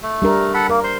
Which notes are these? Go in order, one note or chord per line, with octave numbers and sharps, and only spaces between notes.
A3
G3 D4 A#4
A4 F#5 B5
A#3 A#4
C5 C6